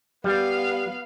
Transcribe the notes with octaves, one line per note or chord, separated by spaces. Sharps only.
G3 B3 F5